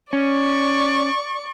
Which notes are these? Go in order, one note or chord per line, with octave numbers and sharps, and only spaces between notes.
C#4 D5 C#6